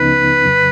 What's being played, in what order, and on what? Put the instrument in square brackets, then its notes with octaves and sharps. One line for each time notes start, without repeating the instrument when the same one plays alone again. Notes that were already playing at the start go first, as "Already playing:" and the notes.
Already playing: [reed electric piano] C#2 C#3 F3 B3 D#4 [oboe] B4
[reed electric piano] F2 C#3 F#3